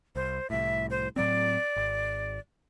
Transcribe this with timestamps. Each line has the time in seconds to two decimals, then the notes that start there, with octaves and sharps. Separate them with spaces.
0.16 C2 C5
0.50 C2 A2 E5
0.90 C5
1.16 A2 F#3 C4 D5
1.77 G#1